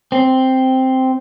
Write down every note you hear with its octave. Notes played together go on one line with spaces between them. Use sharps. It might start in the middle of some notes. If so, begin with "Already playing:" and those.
C4